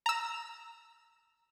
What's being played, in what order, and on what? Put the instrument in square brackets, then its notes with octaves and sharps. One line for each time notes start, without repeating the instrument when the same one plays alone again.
[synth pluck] A#5 E6